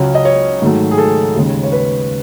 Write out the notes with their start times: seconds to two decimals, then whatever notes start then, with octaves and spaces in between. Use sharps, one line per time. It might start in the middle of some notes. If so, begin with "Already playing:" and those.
Already playing: C#2 C#3 F#3 C#4
0.15 D#5
0.25 C#5
0.62 G#2 D#3 F#3 A3
0.91 G#4
0.98 A4
1.36 D#2 C#3 G#3
1.63 C#5
1.72 B4